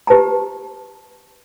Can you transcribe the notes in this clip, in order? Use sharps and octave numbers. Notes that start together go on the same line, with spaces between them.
G4 B4 A5 A#5